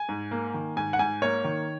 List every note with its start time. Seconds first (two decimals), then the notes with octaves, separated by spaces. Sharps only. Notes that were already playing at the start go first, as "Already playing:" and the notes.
Already playing: G#5
0.09 G#2
0.31 A#3
0.54 D#3
0.76 G#2 G#5
0.93 F#5
0.99 G#2 G#5
1.22 A#3 C#5
1.44 D#3